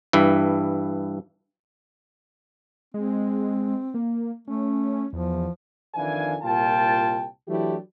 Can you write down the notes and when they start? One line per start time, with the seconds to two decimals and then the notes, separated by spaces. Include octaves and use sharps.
0.13 G2 E3
2.94 G#3 C4
3.94 A#3
4.48 A3 C#4
5.13 E2 F3
5.95 F2 D#3 E3 D4 F5 G#5
6.42 C2 A#2 F4 G5 A5
7.48 E3 F#3 A3 D4 E4 G4